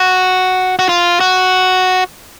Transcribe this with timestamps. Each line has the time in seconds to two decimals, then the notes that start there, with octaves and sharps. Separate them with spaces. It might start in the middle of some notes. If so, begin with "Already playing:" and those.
Already playing: F#4
0.79 F#4
0.89 F4
1.20 F#4